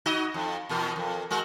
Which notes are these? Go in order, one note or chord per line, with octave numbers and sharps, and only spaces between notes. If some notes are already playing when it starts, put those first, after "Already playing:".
D#4 F#4 D#5
F2
E2 B2 A#4
F2
G#3 F#4 A#4